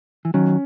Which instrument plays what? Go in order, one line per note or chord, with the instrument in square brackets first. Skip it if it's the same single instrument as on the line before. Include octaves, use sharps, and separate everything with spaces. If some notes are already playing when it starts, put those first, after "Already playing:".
[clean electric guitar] E3
[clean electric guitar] D#3 F#3 [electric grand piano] C#4